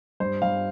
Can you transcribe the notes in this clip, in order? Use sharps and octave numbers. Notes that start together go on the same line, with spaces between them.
G2 C5
G2 F5